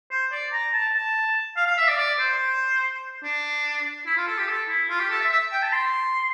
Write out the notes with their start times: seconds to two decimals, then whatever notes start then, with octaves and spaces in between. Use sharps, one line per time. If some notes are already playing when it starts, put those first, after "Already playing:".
0.11 C5
0.32 D5
0.53 A#5
0.74 A5
0.95 A5
1.57 F5
1.67 F5
1.78 E5
1.88 D5
1.98 D5
2.19 C5
3.24 D4
4.07 E4
4.17 F4
4.28 A4
4.38 G4
4.48 A4
4.69 E4
4.90 F4
5.00 G4
5.11 A4
5.21 E5
5.31 E5
5.52 G5
5.62 A5
5.73 C6